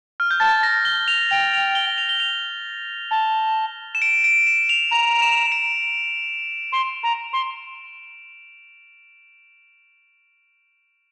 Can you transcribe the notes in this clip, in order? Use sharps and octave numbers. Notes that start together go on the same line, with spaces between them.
F6
G6
A5 A6
A#6
G7
F7
G5 F7
F7
G7
F7
G7
F7
A5
E7
D7
D7
E7
F7
A#5 F7
F7
E7
D7
C6
A#5
C6